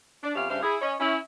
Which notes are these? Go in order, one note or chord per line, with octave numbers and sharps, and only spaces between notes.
D4
F2 B3 C#4 G4 E5 F5
G2 C#3 D4 C5 E5 F5
E4 G#4
C#4 C#5 D#5
C#4 E4